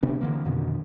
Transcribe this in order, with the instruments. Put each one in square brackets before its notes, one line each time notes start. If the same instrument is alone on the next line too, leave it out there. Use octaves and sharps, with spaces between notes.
[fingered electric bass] C3 B3 D4
D3 E3 A#3
F2 B2 D3 D#3